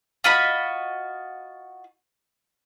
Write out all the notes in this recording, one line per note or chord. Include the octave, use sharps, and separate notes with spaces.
F4 F#4 D#5 B5